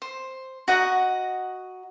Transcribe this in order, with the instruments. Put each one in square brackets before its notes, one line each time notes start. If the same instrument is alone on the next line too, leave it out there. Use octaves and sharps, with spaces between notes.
[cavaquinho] C5
F#4 D#5 F#5 A#5